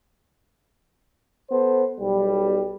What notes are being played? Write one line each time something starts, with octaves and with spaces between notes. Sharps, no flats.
B3 A4 C5
B1 G3